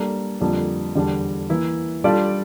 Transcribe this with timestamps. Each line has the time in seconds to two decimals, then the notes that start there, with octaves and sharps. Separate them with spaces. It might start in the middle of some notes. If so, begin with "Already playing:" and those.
Already playing: G3 A#3 D4 A4
0.41 F2 D3 G3 A#3 D4
0.95 E2 D3 G3 D4
1.49 E3 A#3 E4
2.04 G3 D4 F4 A4 D5